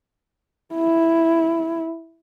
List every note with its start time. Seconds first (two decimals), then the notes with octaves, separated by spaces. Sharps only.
0.74 E4